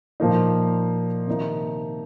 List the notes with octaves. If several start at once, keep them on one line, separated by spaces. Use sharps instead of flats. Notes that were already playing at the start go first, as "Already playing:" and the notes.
A#2 F3 A#3 D#4
C3 D#3 A#3 D#4